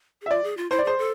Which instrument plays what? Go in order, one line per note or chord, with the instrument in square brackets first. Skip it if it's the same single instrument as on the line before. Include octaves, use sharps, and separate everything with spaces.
[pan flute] G#4
[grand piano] E5
[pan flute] F4 [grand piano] D5
[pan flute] G#4
F4
[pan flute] E4 [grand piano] C5
[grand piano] D5
[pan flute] G#4 [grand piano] C5
[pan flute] A4